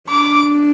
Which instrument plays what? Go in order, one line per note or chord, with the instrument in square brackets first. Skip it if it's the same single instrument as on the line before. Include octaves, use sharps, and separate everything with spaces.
[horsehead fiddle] D4 [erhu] D6